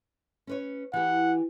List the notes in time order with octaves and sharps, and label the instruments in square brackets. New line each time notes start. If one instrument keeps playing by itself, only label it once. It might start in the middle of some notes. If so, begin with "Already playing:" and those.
[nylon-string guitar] C#4 B4 C#5
[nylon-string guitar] E3 G4 [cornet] F#5